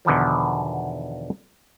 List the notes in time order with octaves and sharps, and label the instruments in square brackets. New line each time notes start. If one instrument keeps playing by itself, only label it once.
[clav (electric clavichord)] E2 B2 D3 D#3 F3